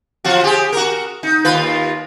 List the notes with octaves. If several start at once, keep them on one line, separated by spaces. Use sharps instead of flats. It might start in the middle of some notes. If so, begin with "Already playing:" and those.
F3 F4 F#4
G4 G#4
F#4 A#4
D#4
D#2 F4 B4